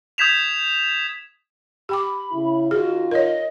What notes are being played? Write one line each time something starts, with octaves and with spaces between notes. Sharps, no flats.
D#6 G6 G#6 B6 E7 F7
G4 G5 B5 D6
C#3 E4
D#3 F4 F#4 G#4
A#4 C#5 D#5